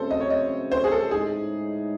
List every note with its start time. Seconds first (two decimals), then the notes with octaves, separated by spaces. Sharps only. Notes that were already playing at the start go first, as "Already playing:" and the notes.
Already playing: F#2 C#3 F#3 A3 C4 A4 C5
0.11 D#5
0.20 C#5
0.30 D#5
0.72 C5
0.84 G#4
0.91 A4
1.11 A2 G#3 D#4 G#4